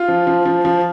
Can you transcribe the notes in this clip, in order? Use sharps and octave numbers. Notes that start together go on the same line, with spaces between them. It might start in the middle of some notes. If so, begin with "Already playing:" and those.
Already playing: F4
F3
F3
F3
F3